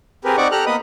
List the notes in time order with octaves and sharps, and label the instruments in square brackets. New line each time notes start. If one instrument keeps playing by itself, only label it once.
[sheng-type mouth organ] C4 G4 G#4 A#4 B4
C4 D#4 D5 F#5 C#6 D6
G4 A4 A#5 F6 F#6
A#3 B3 B4 D#5 B5 D#6